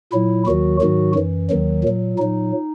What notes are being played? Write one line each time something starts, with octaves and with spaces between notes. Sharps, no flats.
A#2 F#3 E4
D#2 D#3 F#3 F#4
G#2 D#3 F#3 F#4
F#2 E3
D#2 D#3 F#3
A#2 F#3
A#2 F#3 D#4